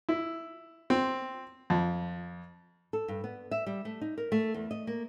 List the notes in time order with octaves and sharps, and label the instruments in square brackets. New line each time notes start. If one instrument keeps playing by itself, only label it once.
[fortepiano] E4
C4
F2
[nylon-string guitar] A4
G2
B3
E5
G3
A3
D#4
A#4
A3
E2
D#5
A#3